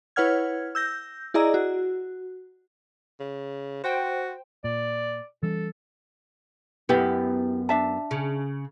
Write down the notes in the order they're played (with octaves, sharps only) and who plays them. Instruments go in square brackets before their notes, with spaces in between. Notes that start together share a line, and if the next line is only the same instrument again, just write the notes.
[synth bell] E4 B4 C#5 F#5 F6 G#6
E6 G6 A#6
E4 G#4 D5 D#5 A#5 E6
F#4
[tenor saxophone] C#3
[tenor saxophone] F#4 [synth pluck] C5 G5
[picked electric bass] A#2 [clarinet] D5
[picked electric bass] E3 G3 C#4 [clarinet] A4
[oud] F#2 B3 [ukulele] E4 G4
[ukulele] D4 E5 A5
[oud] C#3